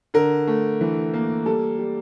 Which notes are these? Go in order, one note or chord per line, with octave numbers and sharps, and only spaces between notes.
D3 A#4
A3
E3
A#3
G3 A4
G3